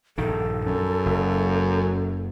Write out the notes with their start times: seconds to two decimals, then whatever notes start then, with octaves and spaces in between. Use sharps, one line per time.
0.18 A#1 G2 D#3 A4
0.65 F#2
1.06 F#1